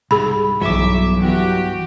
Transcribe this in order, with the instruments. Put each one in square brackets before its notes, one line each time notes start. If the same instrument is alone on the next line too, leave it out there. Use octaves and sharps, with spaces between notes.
[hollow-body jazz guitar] C2 G#2 [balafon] G#4 B5
[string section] B1 E5 [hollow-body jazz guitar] G2 E3 [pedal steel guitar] F#3 D6
[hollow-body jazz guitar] G2 E3 B3 [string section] F#4 G4